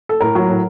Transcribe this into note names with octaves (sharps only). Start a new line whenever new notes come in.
A4
A2 A#4
F#3
A2